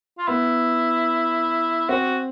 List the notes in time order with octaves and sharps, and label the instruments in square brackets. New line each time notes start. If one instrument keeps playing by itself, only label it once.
[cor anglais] F4
[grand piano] B3 [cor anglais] E4
[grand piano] C4 [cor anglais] F#4